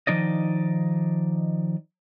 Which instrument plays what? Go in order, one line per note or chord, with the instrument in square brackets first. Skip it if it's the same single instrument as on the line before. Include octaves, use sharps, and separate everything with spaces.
[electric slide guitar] D#3 F3 D#4 D5 D#5